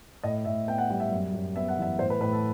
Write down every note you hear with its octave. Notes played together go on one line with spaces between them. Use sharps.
A2 D#5
A2 E5
B3 G5
F#5
G3 F#5
E5
F#2
F#2
B3 E5
F#5
E3 E5
A2 C5
B4
A2 B4
A4